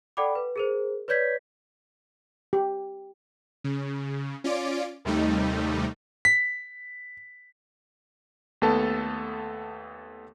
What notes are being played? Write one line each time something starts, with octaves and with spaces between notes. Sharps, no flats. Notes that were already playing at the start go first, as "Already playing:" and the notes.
A4 D5 F#5 G5 B5 D6
B4
G#4 A#4 C5
B4 C#5 D5 G6 G#6 B6
G4
C#3
C#4 F4 D5 D7
D#2 C3 G3 A3 D#4
B6
D#2 A3 B3 A4 A5